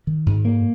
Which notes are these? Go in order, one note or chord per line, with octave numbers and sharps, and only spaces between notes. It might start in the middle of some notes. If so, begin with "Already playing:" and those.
D#3
G#2
A#3